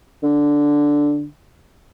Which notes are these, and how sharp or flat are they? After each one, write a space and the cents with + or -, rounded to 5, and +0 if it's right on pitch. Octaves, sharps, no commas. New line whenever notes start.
D3 -5